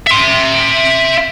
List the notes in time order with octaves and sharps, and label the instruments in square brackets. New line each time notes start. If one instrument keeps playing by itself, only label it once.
[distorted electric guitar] E5 C6